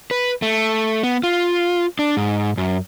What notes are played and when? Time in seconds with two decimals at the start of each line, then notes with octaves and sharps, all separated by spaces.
0.11 B4
0.42 A3
1.03 B3
1.23 F4
1.99 D4
2.17 G#2
2.58 F#2